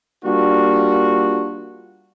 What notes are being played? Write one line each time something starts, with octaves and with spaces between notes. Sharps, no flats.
G3 A#3 D4 F4 F#4